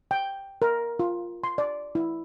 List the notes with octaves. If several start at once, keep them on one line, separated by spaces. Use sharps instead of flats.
G5
A#4
F4
C6
D5
E4